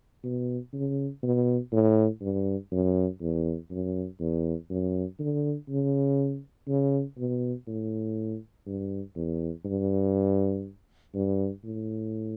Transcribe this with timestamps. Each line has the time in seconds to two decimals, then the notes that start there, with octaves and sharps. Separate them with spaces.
0.24 B2
0.73 C#3
1.23 B2
1.72 A2
2.21 G2
2.72 F#2
3.21 E2
3.71 F#2
4.20 E2
4.70 F#2
5.20 D3
5.69 C#3
6.68 C#3
7.18 B2
7.68 A2
8.67 G2
9.16 E2
9.65 G2
11.15 G2
11.64 A2